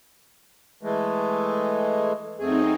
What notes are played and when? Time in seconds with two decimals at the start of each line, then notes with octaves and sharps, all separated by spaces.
0.83 E3 G#3 A3
2.40 F#2 A3 C4 D#4 G#4